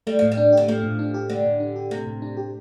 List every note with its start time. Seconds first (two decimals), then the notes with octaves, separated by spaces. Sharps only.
0.07 G3 A3
0.19 A2 F3
0.32 G3
0.37 D4
0.52 D3 G4
0.68 F3 A3
0.83 A2
0.99 D4
1.14 G4
1.30 D3 A3
1.45 A2
1.60 D4
1.76 G4
1.91 C3 A3
2.07 A2
2.22 D4
2.37 G4